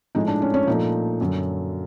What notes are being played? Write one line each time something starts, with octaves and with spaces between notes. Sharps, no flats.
A2 F3 G#3 D#4
D4
C#4
C#4
A#2 F3 A3 D#4
F#2 D3 F#3